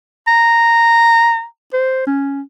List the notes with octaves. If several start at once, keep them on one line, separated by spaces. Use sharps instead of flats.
A#5
C5
C#4